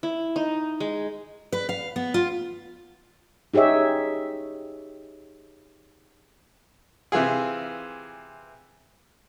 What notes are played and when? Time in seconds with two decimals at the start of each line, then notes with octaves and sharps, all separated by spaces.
0.03 E4
0.36 D#4
0.80 G#3
1.52 B4
1.69 F5
1.96 B3
2.14 F4
3.54 D#4 G4 G#4 C#5 E5
7.12 C3 E3 F4 G#4